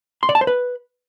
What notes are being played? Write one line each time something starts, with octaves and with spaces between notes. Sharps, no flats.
C6
D5
A5
C5
B4